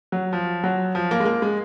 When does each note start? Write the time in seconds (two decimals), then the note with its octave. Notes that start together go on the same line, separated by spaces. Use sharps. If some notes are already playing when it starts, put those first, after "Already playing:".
0.12 F#3
0.33 F3
0.64 F#3
0.95 F3
1.11 A#3
1.20 G#3
1.25 A#3
1.42 G#3